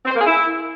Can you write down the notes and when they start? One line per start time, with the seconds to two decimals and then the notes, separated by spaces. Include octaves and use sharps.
0.05 C4
0.10 C5
0.16 A#3
0.21 G#4
0.26 E4